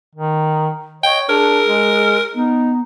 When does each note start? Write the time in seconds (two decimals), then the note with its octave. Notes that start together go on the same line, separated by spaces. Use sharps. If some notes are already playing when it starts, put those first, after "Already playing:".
0.15 D#3
1.03 C#5 D#5 G5
1.29 D4 G#4 A#4
1.67 G#3
2.35 B3 D#4